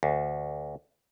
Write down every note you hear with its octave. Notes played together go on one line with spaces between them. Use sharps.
D2